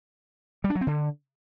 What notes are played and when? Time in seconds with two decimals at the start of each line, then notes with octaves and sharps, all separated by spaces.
0.64 G3
0.70 D4
0.75 F#3
0.81 C4
0.87 D3